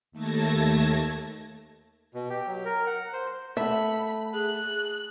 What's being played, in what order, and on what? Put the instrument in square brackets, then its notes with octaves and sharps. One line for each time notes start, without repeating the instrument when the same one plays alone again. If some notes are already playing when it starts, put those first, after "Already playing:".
[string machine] D#2 A3 A5 G#6 A#6
[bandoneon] B2
G4
F#3
A#4
F#5
C5
[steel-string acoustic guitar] A3 F#5 [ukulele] E5 [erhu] B5
[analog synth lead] G#4 [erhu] F#6